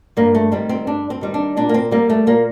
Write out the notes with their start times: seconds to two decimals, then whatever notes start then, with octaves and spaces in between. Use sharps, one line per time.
0.17 G2 A#3
0.35 A3
0.51 D#3 G3 C4
0.69 C4
0.87 G2 D4
1.10 C4
1.21 D#3 G3
1.34 D4
1.57 A#2 D4
1.69 A#3
1.74 C4
1.91 G3 A#3
2.10 A3
2.27 A#2 A#3